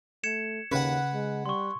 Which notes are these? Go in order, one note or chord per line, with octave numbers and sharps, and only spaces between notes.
A3 G#6 C#7 E7
D#2 C#3 B4 F#5
G#3
G3 C6 C#6